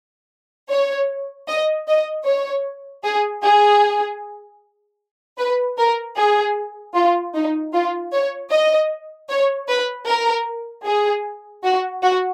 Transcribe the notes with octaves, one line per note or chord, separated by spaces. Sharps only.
C#5
D#5
D#5
C#5
G#4
G#4
B4
A#4
G#4
F4
D#4
F4
C#5
D#5
C#5
B4
A#4
G#4
F#4
F#4